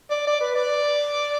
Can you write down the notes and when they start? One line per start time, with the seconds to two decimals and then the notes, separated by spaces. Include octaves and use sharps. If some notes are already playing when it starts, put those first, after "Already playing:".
0.10 D5
0.27 D5
0.41 B4
0.55 D5